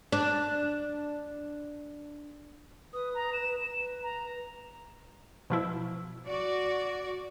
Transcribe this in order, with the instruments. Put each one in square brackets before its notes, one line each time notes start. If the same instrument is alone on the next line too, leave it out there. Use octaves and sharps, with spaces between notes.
[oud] D4 D5
[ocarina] B4 [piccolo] D#6
[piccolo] A#5
E7
[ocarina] B4
[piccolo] A#5
[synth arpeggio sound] B2 F3 E4
[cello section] F#4 D5